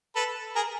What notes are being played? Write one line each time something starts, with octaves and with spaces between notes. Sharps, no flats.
A4 B4
G#4 A#4